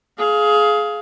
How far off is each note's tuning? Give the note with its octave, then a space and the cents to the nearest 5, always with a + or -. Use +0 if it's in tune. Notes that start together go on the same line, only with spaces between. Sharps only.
G#4 +20 F5 +0